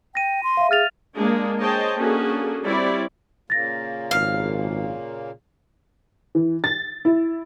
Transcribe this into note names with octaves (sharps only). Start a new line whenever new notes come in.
G5 A#6 D#7
C6
E5 F5
G#4 F6 A6 F7
G#3 A#3 D4 G#4
G#4 C5 C#5 D#5 G5 A5
A#3 C#4 D4 F#4 G#4 A4
G3 C4 E4 C#5 D5
A#2 C#3 A#3 A6 A#6
G#1 F5
E3
A6
E4